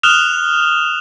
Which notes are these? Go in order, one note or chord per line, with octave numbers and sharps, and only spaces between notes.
D#6 F6 F#6 E7 F7 G7